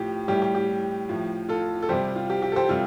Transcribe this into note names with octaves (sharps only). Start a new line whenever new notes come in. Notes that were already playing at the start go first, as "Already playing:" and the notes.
Already playing: A2 F3 G4
A2 G3 G4
G4
G4
A2 F3
F4 A4
A4
C3 G3 G4 C5
F4
G4
G4
A4
G4 C5
C3 G3 F4 A4